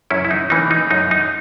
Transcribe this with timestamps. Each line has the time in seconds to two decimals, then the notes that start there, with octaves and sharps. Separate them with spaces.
0.10 F#2 C#4 E4
0.25 E4
0.31 D#4
0.50 E3 A#3 C#4 D#4
0.71 D#4
0.91 F#2 D#4
1.11 D#4